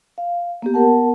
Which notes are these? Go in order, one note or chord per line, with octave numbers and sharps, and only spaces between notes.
F5
A#3 B3 G4
B3 A#4 F#5 A5